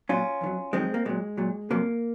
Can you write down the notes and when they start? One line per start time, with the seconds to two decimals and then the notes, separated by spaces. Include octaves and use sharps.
0.09 A#2 F#3 C#4 F4
0.41 F2 D#3
0.46 F#3
0.73 F2 D#3 F#3 G#3 C4
0.94 A#3
1.05 A#2 F#3 G#3
1.38 A#2 F#3
1.71 F2 C3 F#3 A#3